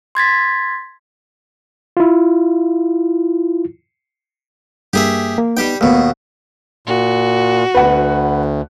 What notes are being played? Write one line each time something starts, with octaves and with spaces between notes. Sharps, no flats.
C6 G#6 A6 B6
E4 F4
G2 A#3 G4 G#4 E5
A#3
G3 B3 D#4 G4 G5
D#2 B2 A3 B3
A#2 F#4
D2 B4 F#5